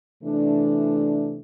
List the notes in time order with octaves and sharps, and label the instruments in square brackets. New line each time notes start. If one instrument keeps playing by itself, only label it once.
[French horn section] C3 E3 A3 D4